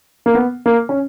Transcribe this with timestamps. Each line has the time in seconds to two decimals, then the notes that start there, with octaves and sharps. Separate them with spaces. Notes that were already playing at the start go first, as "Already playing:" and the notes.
0.26 A#3
0.34 B3
0.66 A#3
0.89 C#4